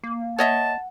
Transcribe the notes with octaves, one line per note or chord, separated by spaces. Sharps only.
A#3
C#5 D#5 E5 F#5 A5